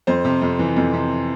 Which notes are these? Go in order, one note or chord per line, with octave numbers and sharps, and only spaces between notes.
F2 C5
C3
F2
E3
F2
C3